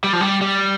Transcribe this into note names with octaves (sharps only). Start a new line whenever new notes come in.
G3
F3
G3
G3